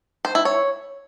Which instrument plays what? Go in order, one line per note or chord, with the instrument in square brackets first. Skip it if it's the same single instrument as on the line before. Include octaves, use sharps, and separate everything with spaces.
[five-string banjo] C5
E4
C#5